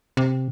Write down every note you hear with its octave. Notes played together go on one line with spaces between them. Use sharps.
C3